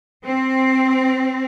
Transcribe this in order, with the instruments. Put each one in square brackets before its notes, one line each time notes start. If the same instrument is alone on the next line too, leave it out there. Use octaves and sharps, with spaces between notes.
[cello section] C4